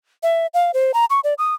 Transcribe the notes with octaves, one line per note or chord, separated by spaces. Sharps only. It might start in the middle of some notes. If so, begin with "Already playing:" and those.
E5
F5
C5
A#5
C#6
D5
D#6